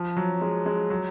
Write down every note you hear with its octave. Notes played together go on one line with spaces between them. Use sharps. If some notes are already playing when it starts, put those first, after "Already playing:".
Already playing: F3
F#3
G#3
G#3
F#3